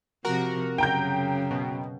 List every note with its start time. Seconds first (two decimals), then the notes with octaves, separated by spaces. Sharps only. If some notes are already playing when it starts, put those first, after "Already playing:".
0.25 C3 F3 F#4 A#4
0.78 F#2 C#3 G5 A#5 G6
1.51 B2